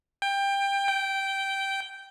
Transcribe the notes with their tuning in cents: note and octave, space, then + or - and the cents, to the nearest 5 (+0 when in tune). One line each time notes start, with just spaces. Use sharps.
G5 +20
G5 -10